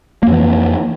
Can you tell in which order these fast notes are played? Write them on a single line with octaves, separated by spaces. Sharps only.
A#3 F2 E3